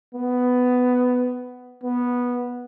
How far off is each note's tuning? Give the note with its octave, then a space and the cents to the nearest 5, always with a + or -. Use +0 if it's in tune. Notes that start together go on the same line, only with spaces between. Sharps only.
B3 +10
B3 -10